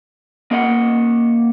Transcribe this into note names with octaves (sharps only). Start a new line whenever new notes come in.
A#3 D#5 F#5